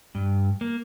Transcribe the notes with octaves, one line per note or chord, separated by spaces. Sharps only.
G2
A#3